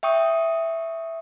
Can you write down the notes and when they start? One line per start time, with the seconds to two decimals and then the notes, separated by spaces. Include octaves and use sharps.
0.03 E5 G5 C#6 D#6